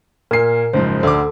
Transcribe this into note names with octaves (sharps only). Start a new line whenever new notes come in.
A#2 A#4 G#5 C7
F#1 G#2 F3 C5
D2 D3 A4 D6